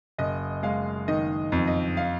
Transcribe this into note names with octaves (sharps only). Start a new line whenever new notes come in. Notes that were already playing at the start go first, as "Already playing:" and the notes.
F#1 D#5
G#3 F5
D#3 D#5
F2
D#5
F5